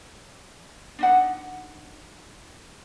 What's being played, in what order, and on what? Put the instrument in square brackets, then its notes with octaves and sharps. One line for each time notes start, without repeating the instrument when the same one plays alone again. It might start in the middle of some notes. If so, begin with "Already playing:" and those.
[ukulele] D4 D#4 F#5